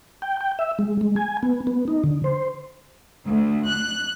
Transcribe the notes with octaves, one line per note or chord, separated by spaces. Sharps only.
G5
G5
E5
G#3
G#3
G#5
B3
B3
D#4
D3
C5
D2
F#6